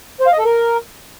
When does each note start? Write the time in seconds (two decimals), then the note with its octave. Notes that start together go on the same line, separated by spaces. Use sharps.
0.20 C5
0.26 F5
0.33 D#5
0.39 A4
0.45 A#4